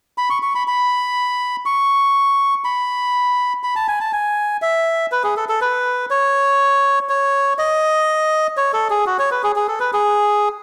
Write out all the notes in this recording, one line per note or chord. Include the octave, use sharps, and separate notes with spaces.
B5
C#6
C#6
B5
B5
C#6
B5
B5
A5
G#5
A5
G#5
E5
B4
G#4
A4
A4
B4
C#5
C#5
D#5
C#5
A4
G#4
F#4
C#5
B4
G#4
G#4
A4
B4
G#4